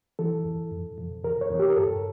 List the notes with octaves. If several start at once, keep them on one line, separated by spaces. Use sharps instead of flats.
E3 A4
E2
F2
F2
E2 A#4
C#5
E2
G4
A#4
G2 A4